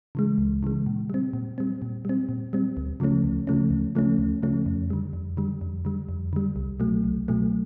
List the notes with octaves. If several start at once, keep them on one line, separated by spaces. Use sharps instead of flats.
C#3 E3 G#3
C#2
C#3 E3 G#3
A#2
G3 C4
A#2
G3 C4
A#2
G3 C4
A#2
G3 C4
D2
C#3 F3 A3 C#4
D2
C#3 F3 A3 C#4
D2
C#3 F3 A3 C#4
D2
C#3 F3 A3 C#4
F2
D3 G3
F2
D3 G3
F2
D3 G3
F2
D3 G3
C2
B2 F#3 A3
C2
B2 F#3 A3